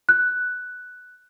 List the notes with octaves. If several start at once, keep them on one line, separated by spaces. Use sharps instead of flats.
F#6